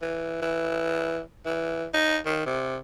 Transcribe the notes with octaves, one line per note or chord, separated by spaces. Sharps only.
E3
E3
E3
D#4
D#3
C3